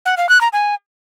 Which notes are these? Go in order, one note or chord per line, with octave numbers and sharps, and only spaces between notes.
F#5
F5
F#6
A#5
G#5